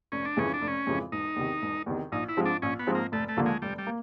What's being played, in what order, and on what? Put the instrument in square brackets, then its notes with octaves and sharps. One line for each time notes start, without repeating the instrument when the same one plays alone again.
[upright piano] F1 [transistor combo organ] C#4
[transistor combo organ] D4
[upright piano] F2 C#3 E3 G#3 [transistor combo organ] C#4
[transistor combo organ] D4
[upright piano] F1
[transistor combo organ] C#4
[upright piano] F2 C#3 E3 G#3
[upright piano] E1 [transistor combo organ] D#4
[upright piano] E2 C3 D#3
E1
E2 C3 D#3
[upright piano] A#1 [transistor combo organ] D#4
[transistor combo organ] E4
[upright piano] G#2 F3 G#3 C4
[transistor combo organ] D4
[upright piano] A#1 [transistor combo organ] C#4
[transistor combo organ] B3
[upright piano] G#2 F3 G#3 C4
[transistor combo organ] A#3
[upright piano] F1 [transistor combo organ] A3
[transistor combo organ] A3
[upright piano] D#2 D3 F3 A#3
[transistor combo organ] G#3
[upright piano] F1 [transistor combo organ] G3
[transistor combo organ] G3
[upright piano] A#3